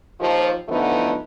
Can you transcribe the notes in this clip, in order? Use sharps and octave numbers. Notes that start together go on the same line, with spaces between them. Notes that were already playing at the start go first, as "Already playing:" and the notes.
D#2 F3
D3 E3 F3 A3 B3 D#4